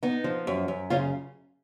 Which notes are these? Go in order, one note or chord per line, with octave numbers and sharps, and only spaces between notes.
B3 D#4
F3
F#2
F#2
C#3 C#4 F4